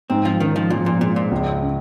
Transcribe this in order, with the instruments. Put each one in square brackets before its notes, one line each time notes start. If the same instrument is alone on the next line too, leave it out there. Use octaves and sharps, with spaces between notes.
[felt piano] G#2 [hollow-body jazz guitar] C4
[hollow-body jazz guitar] F3
[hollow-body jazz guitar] D#3 [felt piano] C#4
[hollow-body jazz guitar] F3
[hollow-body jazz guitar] A#2 [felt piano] F3
[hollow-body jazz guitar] A#2
[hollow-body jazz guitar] A#2 [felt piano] G#3
[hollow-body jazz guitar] A#2
[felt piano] C#2
C#4